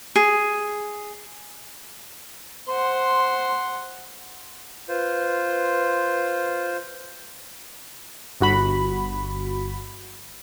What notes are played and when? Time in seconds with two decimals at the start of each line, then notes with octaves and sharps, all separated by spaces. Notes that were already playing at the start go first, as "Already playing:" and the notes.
0.16 G#4
2.68 C5 F#5 C6
4.88 F4 B4 C5
8.41 G1 F#4 B5